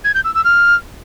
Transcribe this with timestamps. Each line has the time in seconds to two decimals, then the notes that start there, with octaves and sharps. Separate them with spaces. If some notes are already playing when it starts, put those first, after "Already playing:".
0.04 G#6
0.14 G6
0.24 E6
0.34 E6
0.44 F6